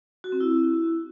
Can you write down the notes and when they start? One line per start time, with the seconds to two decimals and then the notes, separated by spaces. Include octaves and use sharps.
0.24 F#4
0.32 C4
0.40 E4